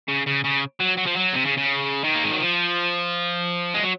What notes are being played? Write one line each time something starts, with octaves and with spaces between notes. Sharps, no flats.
C#3
C#3
C#3
F#3
F#3
F3
F#3
C3
C#3
C#3
D#3
A#3
G#3
F#3
F3
G#3
F#3